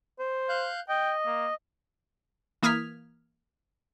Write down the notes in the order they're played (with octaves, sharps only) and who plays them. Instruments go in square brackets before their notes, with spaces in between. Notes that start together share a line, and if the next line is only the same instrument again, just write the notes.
[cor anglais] C5
[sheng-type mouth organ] F5 F#6 G6
[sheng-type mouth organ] D#5 [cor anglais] G5
[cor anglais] A#3
[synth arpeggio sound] E3 A#3 D#6 F6 G#6 B6